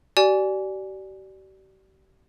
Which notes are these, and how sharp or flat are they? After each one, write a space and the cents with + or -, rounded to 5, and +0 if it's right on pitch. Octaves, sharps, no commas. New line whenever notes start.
G4 -45 D5 +5 G#5 +0